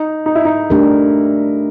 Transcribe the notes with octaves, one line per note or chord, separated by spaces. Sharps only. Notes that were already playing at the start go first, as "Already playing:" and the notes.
Already playing: D#4
D#4
E4
D#4
A3 D4 G4 A#4